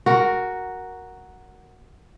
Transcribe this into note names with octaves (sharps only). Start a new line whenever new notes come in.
F#4 A#4